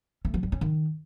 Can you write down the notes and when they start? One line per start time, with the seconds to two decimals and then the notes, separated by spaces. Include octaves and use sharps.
0.25 A3
0.34 F3
0.43 G3
0.52 C#4
0.61 D#3